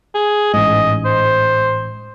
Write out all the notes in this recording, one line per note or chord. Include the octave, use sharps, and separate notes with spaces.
G#4
A1 G#2 D#5
C5